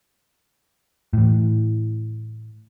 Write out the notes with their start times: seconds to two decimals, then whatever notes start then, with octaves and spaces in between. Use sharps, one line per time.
1.13 A2 E3